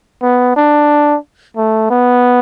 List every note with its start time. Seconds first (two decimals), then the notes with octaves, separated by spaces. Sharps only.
0.22 B3
0.56 D4
1.57 A3
1.90 B3